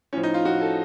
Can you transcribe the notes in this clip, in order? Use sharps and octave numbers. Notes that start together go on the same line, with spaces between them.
A2 F3 C#4
D#4
F4
A2 F3 F#4
A4